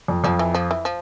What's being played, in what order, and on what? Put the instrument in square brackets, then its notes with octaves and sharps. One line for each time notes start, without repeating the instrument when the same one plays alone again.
[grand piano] F2
[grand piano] F2 [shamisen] F3
[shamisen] E3
F3
E3
F3